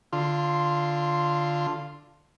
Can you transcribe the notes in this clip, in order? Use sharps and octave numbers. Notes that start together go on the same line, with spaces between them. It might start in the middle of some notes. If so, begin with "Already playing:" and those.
D3 F4 C6